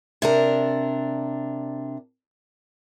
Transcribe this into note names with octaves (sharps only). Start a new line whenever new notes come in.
C3 D4 A#4